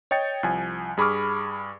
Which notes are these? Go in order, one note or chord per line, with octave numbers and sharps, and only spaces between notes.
C#5 D#5 G5 A6 C#7
C2 F3 G#5
G2 G#4 B5 C#6 D6 F6